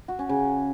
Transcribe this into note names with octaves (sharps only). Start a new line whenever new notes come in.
F#4
C#4
C#3